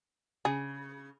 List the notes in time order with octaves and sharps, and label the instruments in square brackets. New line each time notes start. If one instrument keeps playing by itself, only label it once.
[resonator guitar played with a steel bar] C#3 [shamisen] G#4